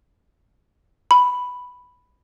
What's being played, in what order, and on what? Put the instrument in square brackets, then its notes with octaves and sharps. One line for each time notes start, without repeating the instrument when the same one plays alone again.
[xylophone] B5